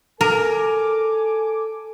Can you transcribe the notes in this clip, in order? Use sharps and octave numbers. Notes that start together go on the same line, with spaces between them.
A4 A#4 G#5 D6